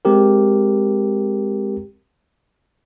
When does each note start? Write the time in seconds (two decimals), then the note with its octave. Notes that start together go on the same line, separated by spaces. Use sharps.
0.05 G#3 C4 G4 A#4